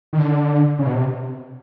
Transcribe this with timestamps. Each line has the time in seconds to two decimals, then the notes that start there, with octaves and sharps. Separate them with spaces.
0.13 D#3
0.19 D3
0.79 C#3
0.87 B2
0.95 C3